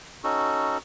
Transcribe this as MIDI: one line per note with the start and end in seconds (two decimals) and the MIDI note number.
0.24 0.78 61
0.24 0.78 63
0.24 0.78 66
0.24 0.78 69